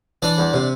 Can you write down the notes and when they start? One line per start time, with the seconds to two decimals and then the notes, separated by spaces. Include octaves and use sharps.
0.22 E3 D4 D5
0.38 E2
0.54 C3